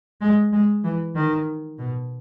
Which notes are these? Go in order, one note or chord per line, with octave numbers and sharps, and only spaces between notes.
G#3
G#3
E3
D#3
B2